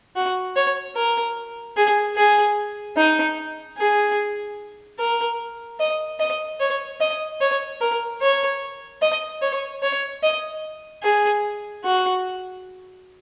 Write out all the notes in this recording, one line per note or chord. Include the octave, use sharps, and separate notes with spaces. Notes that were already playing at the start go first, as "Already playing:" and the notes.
F#4
C#5
A#4
G#4
G#4
D#4
G#4
A#4
D#5
D#5
C#5
D#5
C#5
A#4
C#5
D#5
C#5
C#5
D#5
G#4
F#4